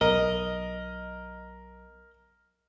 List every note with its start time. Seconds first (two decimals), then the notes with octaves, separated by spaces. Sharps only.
0.01 B1 A#4 D#5